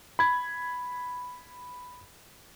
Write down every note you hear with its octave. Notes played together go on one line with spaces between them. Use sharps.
B5 G#6